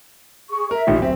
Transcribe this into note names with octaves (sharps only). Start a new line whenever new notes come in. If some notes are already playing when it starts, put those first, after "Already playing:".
G#4 C#6
A#4 E5
A1 A#2 D#3
D1 C4